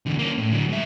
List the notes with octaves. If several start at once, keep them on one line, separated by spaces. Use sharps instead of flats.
E2 D3
A#3 C#4
A2
D3 F#3
G#2 E5